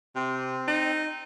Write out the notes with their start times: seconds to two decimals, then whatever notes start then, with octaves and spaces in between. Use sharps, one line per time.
0.16 C3 C4
0.68 D#4